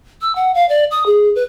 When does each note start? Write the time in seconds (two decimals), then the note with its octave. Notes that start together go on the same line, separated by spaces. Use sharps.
0.21 E6
0.36 F#5
0.54 F5
0.69 D5
0.91 D#6
1.06 G#4
1.36 B4